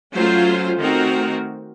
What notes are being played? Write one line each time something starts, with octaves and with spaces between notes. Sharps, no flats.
F#3 A3 C#4 F4 C5
D#3 A3 C4 F#4 A#4